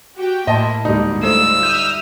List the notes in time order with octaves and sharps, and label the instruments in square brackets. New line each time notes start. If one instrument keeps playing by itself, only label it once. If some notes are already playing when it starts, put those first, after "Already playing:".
[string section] F#4 G4 G5
[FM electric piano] A2 A5 C6 [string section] A#3 E4 [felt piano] D#5
[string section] D2 G#2 A#3 [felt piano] G3 D#4
[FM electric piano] A3 C5 D#5 [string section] F4 [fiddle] E6
[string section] E5 D#6 F6 [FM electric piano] G6